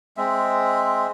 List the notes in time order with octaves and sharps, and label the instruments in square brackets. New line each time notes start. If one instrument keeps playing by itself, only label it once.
[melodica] G#3 C4 E5